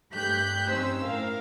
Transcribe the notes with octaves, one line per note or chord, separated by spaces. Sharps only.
G2 A3 G4 F#6 G6 B6
G2 C4 C#4 D#4 C5 E6
A2 A#4 F5